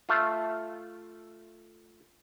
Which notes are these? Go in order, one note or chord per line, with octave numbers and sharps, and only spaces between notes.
A3 F4